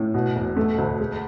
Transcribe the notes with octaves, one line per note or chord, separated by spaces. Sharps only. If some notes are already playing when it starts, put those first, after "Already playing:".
Already playing: A2
B2
E1
A3
D2
G#3